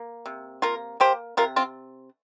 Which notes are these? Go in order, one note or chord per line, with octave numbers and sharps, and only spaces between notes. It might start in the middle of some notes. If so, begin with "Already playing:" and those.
Already playing: A#3
C3
A#3 F4 A#4
A#3 G4 C5
C3 F4 A#4
C4 F4